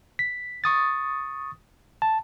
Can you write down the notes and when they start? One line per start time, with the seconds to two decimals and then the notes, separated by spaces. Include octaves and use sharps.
0.19 B6
0.64 C#6 D#6 A6
2.02 A5